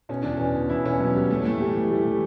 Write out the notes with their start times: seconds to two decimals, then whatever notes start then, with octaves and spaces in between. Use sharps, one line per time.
0.09 B2 C#4
0.23 E2 D4
0.37 B2 C#4
0.55 E2
0.70 E2 E4
0.84 B2 C#4
1.00 B2 F#3
1.15 E2 G3
1.30 E3 A3
1.45 A2 A3
1.61 A2 G3
1.75 E3
1.90 A2 G3
2.06 E3